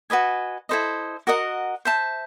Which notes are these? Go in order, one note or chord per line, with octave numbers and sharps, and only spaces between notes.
F#4 B4 D#5 G#5
E4 A4 C5 D#5
F#4 A#4 D#5 F#5
C5 E5 A5